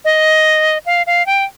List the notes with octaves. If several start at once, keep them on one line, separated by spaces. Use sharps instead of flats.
D#5
F5
F5
G5